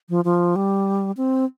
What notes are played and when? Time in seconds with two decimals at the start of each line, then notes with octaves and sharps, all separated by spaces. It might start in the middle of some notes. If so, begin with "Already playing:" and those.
0.09 F3
0.25 F3
0.56 G3
1.17 C4